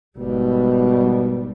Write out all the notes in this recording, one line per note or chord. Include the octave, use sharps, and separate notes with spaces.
G#1 B2 G3